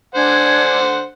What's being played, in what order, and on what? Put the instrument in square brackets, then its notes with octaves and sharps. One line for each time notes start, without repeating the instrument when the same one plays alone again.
[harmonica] D3 C5 F#5 [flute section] D4 G#5 G#6